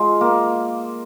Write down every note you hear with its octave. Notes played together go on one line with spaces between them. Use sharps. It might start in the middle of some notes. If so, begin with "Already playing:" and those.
Already playing: G#3 F4
A#3